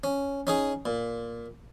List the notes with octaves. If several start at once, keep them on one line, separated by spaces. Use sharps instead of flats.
C#4
C#4 D#4 G#4
A#2